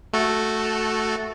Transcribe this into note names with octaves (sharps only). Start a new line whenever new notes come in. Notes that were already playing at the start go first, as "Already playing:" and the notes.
A3 F#4 A4